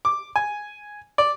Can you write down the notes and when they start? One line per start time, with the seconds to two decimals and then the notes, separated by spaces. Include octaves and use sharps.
0.05 D6
0.36 G#5
1.18 D5